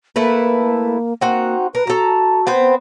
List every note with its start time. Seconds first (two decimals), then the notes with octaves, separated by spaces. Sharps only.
0.16 A3 A#3 E4 B4
1.21 A#3 C4 D#4 F#4
1.75 A#4 B4
1.87 F#4 A4 A#5
2.47 B3 C4 C5